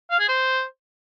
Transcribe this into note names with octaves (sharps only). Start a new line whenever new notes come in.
F5
G#4
C5